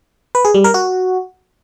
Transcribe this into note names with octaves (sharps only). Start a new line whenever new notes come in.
B4
G#4
G3
A#4
F#4